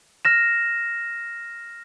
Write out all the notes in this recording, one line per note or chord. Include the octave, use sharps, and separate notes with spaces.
F6 A#6 E7